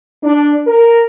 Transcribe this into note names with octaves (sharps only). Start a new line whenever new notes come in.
D4
A#4